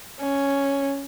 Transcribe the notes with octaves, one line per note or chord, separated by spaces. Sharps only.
C#4